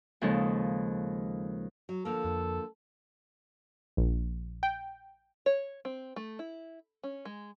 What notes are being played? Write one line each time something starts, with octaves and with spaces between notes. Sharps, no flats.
D#2 C#3 F3 G#3 D#4 A4
F#3
D3 F3 A#3 A4
F2
A#1
G5
C#5
C4
A3
E4
C#4
G#3